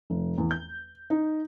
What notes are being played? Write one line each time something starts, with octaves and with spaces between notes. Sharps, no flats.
F1
E2
G6
D#4